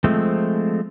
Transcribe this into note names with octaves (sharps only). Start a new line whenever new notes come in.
F3 G#3 A3 C4